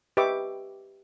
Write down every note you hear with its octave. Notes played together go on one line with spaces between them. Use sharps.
G4 B4 D#5 E5 C#6 D6